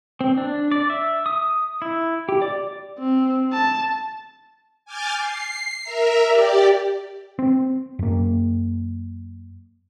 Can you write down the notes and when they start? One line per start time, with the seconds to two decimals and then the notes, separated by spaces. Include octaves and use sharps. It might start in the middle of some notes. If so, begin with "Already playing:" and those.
0.21 C4
0.38 D4
0.71 D5
0.90 E5
1.26 D#6
1.82 E4
2.29 G4
2.42 D5
2.99 C4
3.53 A5
4.85 G#5 D6 F6 G6 A6
5.17 C7
5.83 A#4 E5 A#5
6.26 G4 D5
7.39 C4
7.99 F#2 A#3